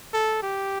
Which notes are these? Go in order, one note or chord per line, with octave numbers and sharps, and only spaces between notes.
A4
G4